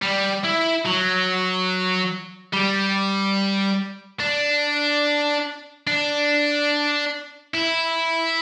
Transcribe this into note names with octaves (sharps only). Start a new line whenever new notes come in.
G3
E4
F#3
G3
D4
D4
E4